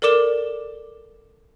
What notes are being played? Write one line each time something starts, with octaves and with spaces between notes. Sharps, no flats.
A4 A#4 D5 D6 E7 G7